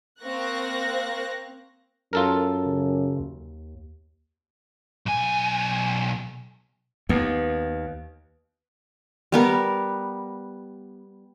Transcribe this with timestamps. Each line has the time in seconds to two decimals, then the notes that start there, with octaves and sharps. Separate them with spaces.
0.22 A#3 C4 F5 C#6 F#6 A#6
2.13 F#2 F4 A4 A#4
2.66 C#3
3.20 D#2
5.06 B1 G#5
7.09 D#2 B3
9.32 G3 B3 A#4